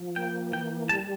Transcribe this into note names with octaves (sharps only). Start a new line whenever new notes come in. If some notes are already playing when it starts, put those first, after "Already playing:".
Already playing: F3
A#3 G5
E3 G5
G3 A5